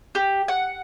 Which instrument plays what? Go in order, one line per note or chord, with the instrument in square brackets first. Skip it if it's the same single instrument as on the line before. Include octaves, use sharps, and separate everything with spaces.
[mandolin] G4
F#5